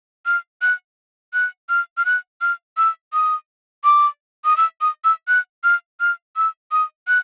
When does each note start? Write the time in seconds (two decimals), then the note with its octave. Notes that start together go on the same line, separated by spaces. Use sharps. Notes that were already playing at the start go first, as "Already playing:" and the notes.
0.26 F6
0.62 F#6
1.34 F#6
1.69 F6
1.98 F6
2.06 F#6
2.42 F6
2.77 E6
3.13 D#6
3.84 D6
4.45 D#6
4.57 E6
4.81 D#6
5.04 E6
5.28 F#6
5.64 F6
6.01 F6
6.37 E6
6.72 D#6
7.08 F#6